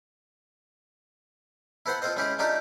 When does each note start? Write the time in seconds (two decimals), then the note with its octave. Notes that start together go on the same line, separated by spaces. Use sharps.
1.86 E4 A4 B4 C5 F#5 C6
2.02 C4 F4 A4 C5 D#5
2.17 G#3 C#4 E4 G4 G#4
2.39 A3 D4 D#4 F4 G4 A4